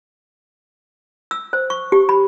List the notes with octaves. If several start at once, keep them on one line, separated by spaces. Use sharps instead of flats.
E6
C5
C#6
G4
B5